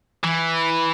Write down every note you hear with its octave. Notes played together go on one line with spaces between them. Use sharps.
E3